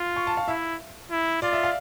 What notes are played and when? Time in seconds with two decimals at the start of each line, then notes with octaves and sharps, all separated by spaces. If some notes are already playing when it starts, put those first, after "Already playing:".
Already playing: F4
0.16 C#6
0.27 A5
0.37 F5
0.48 E4 E5
1.11 E4
1.42 F4 D5
1.53 E5
1.63 F5